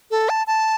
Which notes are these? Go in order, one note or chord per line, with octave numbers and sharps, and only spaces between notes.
A4
A5
A5